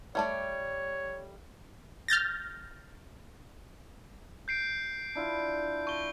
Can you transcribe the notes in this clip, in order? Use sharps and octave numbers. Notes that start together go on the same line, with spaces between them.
G3 A3 C#5 D5
F6 G6 A6 A#6
G6 C7 D7
D4 E4 F4
A5 C#6 G7